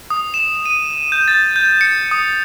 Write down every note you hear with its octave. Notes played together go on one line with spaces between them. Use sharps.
D#6
E7
D#7
G6
A6
G6
C#7
D#6